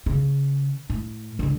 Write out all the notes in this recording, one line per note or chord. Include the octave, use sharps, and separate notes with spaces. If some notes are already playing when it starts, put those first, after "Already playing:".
C#3
A2
C#2 D3